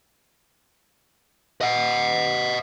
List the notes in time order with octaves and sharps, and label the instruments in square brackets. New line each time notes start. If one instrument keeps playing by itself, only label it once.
[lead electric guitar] D#5 F#5